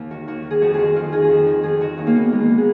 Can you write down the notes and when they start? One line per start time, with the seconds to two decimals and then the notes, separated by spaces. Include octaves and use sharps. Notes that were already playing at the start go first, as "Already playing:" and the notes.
Already playing: D#2
0.11 D#3 F#4
0.27 D#2 F#4
0.45 D#3
0.51 G#4
0.61 F2 F#4
0.74 D#3 F#4 G#4
0.95 F2 F4
1.12 D#3 G#4
1.24 G#4
1.30 F2 F#4
1.46 D#3
1.63 F2 G#4
1.81 D#3 F#4
1.98 D#2 D#4
2.07 A#3
2.15 D#3 B3
2.32 D#2 G#3
2.40 A#3
2.49 D#3 B3
2.58 G#4